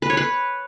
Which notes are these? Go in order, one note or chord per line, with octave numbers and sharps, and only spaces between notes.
B4
C#5
B4